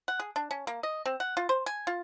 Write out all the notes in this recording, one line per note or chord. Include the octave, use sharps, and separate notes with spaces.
F#5
G#4
D4
C#4
A#3
D#5
C4
F#5
F4
C5
G#5
F4